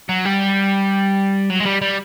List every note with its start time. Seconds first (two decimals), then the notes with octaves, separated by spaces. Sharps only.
0.09 F#3
0.25 G3
1.50 F#3
1.60 G#3
1.66 G3
1.81 G3